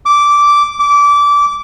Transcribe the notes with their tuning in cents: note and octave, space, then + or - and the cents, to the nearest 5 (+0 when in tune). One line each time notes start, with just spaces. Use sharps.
D6 -10
D6 -20